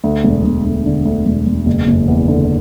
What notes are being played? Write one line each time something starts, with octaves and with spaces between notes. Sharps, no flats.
D2
E1
E1
D2
D3
D2
E1
E1
F#1
F#1
E2
D3